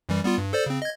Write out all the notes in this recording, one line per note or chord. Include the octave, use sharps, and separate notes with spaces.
F#2 E3 G3
G3 B3 F4
G2
A4 C5 D5
C#3 C4
D#5 G#6